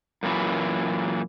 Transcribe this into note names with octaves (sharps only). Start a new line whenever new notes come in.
F#2 A#2 E3